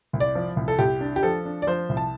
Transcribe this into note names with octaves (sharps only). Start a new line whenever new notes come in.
C2
D5
F3
C2
A4
C2 G4
D4
G4
F3 A4
D4
D5
F3 C5
C2
A5